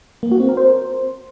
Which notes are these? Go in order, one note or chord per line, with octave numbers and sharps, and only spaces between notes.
A#3
F#4
C4
A#4
C5